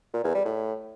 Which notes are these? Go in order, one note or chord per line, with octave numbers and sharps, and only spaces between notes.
A#2
E2
G3
A2